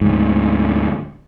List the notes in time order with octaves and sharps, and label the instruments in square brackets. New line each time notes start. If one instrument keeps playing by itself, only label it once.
[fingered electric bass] D2 G#2